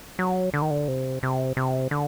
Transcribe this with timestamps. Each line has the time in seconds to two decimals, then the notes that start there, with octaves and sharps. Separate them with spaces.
0.19 F#3
0.54 D3
0.62 D#3
0.71 D3
0.88 C3
1.23 C3
1.57 C3
1.91 D3